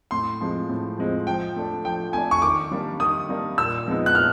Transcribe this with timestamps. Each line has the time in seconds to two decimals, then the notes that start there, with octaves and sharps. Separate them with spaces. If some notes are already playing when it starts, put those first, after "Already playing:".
0.11 A2 C6
0.41 F3 G#3 C4
0.70 A2
0.97 F3 G#3 C4
1.27 F3 G5
1.56 A3 D4
1.85 F3 G5
2.13 A3 D4 G#5
2.31 C#6
2.42 D#3 D6
2.71 G3 A#3 D4
3.00 D#3 D#6
3.29 G3 A#3 D4
3.58 A#2 E6
3.86 F3 G#3 B3 D#4
4.06 F#6
4.15 A#2 F6